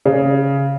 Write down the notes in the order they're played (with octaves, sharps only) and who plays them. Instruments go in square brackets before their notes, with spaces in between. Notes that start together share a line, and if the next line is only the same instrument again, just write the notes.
[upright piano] C#3